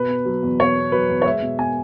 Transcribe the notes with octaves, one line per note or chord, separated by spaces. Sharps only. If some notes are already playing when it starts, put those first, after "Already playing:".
Already playing: B2 B4
B3
F#3
E2
B2 C#5
B3
F#3 B4
E2
C#5
G#3 E5
B2
B3 G#5